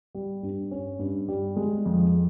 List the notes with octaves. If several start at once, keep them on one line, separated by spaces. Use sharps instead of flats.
G3
G2
C#4
G2
G3
G#3
F2